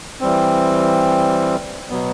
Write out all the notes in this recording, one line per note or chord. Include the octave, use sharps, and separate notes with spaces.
E3 G3 C4
B2 F#3 B3